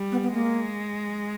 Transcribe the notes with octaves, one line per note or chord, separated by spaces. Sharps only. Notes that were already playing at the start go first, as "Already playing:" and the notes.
Already playing: G3
B3
B3
G#3 A#3